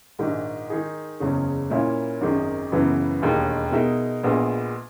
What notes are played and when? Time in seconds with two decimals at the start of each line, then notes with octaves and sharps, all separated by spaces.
0.19 A#1 G#2 D#3
0.70 D#3 G#3 D#4 G#4
1.20 F#1 E2 C#3 G#3 C#4
1.70 A#2 A#3 C#4 E4
2.21 G#1 F#2 D#3 G#3
2.72 F#1 F#2 C#3 E3 B3
3.22 E1 D#2 D#3 G#3
3.72 B2 G#3 D#4 A#4 E5
4.23 A#1 A#2 G#3 B3